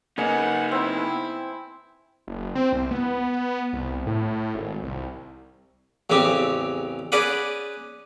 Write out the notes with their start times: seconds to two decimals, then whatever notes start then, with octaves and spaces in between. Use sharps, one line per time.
0.18 C#3 A#3 B3 D#4 F#5 G#5 C#7
0.72 C4 E4
2.28 F#1
2.55 C4
2.73 C2
2.91 B3
3.73 C2
4.07 A2
4.55 G#1
4.83 C2
6.10 A1 E2 C#3 C4 G4
7.12 C#4 G#4 B4 D5 F#5